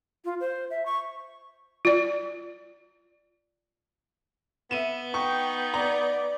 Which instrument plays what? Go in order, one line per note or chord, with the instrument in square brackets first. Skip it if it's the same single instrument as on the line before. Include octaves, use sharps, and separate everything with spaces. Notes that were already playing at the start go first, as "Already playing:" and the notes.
[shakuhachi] F4
C5
E5
C#6
[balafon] F4 D5
[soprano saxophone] B3 [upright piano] E5 D#7 E7
[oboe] D#4 [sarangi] G5 [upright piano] C#6
[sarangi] D5 [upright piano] A#5